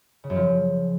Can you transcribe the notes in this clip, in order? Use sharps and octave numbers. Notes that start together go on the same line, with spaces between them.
C#3
F#2
F3